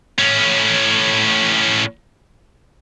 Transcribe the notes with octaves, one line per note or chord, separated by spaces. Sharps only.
A2 C#4